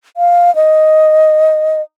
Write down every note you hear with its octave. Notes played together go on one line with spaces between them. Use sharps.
F5
D#5